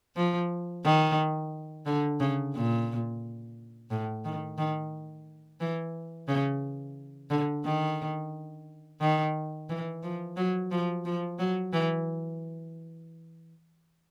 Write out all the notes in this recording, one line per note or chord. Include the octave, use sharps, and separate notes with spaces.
F3
D#3
D3
C#3
A#2
A2
D#3
D#3
E3
C#3
D3
D#3
D#3
E3
F3
F#3
F3
F3
F#3
E3